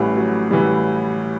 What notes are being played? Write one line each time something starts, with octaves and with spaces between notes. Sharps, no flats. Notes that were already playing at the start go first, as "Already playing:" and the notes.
Already playing: A1 A2 E3 G3
F#3
A2 E3 G3